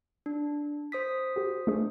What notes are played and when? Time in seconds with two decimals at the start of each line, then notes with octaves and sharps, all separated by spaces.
0.26 D4
0.92 C5 D#6 B6
1.36 F#4 G4
1.67 A3 D4 G#4